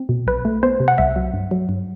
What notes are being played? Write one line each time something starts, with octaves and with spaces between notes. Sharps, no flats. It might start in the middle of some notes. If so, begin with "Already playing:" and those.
Already playing: C4
B2
B1 B4
A3
B3 C5
C3
F#5
C2 E5
F#3
G2
F#3
G2